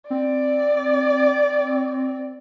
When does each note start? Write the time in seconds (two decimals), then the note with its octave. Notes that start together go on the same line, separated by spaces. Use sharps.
0.10 C4 D5